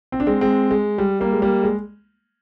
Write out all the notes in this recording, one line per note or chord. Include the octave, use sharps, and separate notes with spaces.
C4
D4
G#3 C4
G#3 C4
G#3
G3
G3 A#3
G#3
G3 A#3
G#3